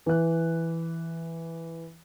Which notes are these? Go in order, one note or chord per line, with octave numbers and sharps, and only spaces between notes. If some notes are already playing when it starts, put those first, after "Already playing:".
E3 F#6